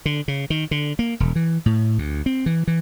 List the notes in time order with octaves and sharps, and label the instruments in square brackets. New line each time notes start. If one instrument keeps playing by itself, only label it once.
[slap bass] D3
C#3
D#3
D3
A#3
E1
E3
A2
D2
C4
E3
E3